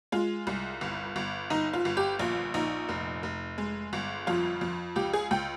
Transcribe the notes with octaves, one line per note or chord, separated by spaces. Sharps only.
G#3 F4
C2
G1
G1
G1 D#4
F4
G1
G4
A#1 F4
A#1 D#4
F1
F1
G#3
G1
F2 F4
F2
C#2 G4
G#4
C#2 G5